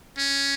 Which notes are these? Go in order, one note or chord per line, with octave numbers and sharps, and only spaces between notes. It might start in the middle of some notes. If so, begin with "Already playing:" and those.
C#4